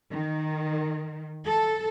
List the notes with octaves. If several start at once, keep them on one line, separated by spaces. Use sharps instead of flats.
D#3
A4